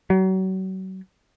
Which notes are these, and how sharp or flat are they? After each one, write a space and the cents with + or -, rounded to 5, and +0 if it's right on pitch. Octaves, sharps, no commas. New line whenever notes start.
F#3 +35